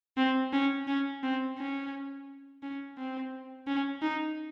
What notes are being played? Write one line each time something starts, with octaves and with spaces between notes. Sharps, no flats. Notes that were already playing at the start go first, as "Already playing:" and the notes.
C4
C#4
C#4
C4
C#4
C#4
C4
C#4
D#4